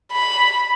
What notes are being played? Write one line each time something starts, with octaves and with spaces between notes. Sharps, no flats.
B5